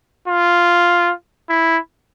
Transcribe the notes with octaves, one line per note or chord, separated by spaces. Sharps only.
F4
E4